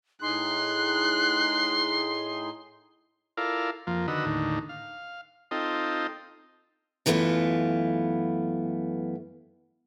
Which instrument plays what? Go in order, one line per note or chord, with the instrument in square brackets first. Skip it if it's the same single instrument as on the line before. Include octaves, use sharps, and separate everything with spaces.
[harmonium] A2 D#4 G#4 [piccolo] C6 [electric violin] F#6
[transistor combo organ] E4 F4 A4 A#4 D5 F5
F2 F3 A#3
D3 D#3 F#4 B4 D#5 E6
D#2 A2 D3 D#4
F5
C4 D#4 F4 A4 D#5 G5
[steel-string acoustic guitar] F#2 E3 A3 B3 E4 F4